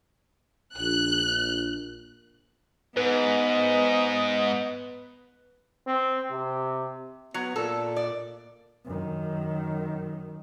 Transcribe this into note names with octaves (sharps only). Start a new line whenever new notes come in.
A#1 F#6
G#2 B3 B4 D#5
C4
C3
F#3 B3
A#2 A4
D5
F#2 D#3